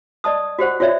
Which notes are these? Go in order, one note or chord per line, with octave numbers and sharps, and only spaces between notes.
D5 D#5 A5 D#6
F#4 G4 C5 F#5
F4 F#4 C#5 D5 E5